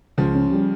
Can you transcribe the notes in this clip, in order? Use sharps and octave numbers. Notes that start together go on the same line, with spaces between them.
C#2 C#3 F3
C#4
G3